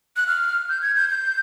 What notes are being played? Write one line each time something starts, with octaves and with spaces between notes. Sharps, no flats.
F#6
F6
G6
G#6
G6
G6